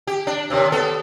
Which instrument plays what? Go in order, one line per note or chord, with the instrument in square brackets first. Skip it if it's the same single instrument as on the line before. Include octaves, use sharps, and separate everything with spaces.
[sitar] G4
D4
D#2 C3
B3 A4